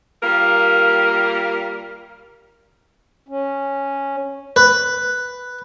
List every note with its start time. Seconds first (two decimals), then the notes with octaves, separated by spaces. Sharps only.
0.21 G3 A#3 F4 A#4
3.28 C#4
4.56 B4